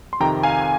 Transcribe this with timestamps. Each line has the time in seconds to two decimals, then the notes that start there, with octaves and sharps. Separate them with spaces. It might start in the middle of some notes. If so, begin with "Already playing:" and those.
0.13 C6
0.20 F2 C3 D#3 G5 A#5
0.43 F5 G#5